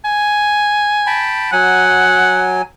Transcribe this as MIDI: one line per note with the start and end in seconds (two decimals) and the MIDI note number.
0.05 1.30 80
1.07 1.51 79
1.07 1.51 81
1.07 1.51 83
1.52 2.62 54
1.52 2.53 78
1.52 2.62 80